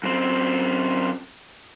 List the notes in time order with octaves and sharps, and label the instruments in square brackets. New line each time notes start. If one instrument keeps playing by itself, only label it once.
[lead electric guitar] F#2 C4